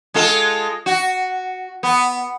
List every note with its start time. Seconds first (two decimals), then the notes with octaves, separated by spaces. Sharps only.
0.14 G#3 F4 A4
0.86 F#4
1.83 B3